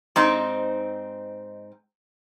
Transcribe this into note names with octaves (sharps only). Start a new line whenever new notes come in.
G#2 C4 D#4